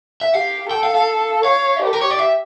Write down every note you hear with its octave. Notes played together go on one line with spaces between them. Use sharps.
E5
G4 F5
A4 G5
F5
F5
C#5 F5
G4 A4
A#4
C#5
D5
E5